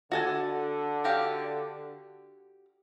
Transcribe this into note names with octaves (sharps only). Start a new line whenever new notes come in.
D3 F#4 A4 G#5
F#4 G4 F5